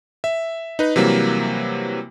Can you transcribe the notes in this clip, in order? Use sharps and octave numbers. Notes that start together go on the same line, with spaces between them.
E5
D#4 B4
C3 E3 F#3 G3 A#3